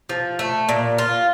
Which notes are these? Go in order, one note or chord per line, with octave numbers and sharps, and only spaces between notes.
F3
A3
A#2
F4